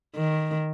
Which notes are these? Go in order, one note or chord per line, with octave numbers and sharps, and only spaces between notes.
D#3